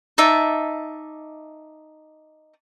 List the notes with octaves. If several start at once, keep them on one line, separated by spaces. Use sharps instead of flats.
D#4 D5 E5 A5